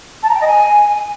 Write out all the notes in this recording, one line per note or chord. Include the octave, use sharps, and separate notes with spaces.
A5
A#5
G5
D#5
G#5